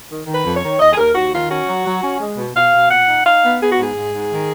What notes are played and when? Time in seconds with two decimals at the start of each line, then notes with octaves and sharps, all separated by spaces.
0.09 D#3
0.27 D#3
0.33 B4
0.44 F2
0.56 C#5
0.62 D#3
0.79 D#2 D#5
0.93 G#4
0.97 D#2 A#4
1.14 D#2 F#4
1.32 D#3 F4
1.50 C#4 F#4
1.67 F#3
1.84 F#3
2.02 C#4
2.19 G#3
2.37 B2
2.55 B2 F5
2.72 B2
2.90 A#2 F#5
3.08 D#4
3.25 D#4 F5
3.43 B3
3.61 B3 G#4
3.71 F#4
3.78 G#2 G#4
3.95 G#2
4.13 G#2
4.31 D#3